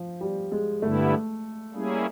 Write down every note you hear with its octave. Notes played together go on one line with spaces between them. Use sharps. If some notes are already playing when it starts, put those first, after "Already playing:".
Already playing: F3
G3
G#3
G2 D3 G3 A3 B3 E4
G3 A#3 C#4 E4 G#4